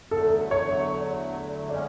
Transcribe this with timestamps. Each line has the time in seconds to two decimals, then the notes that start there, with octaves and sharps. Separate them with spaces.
0.11 E2 D3 F#3 A3 A4
0.51 C#5
1.69 D3 G#3 C#4 D5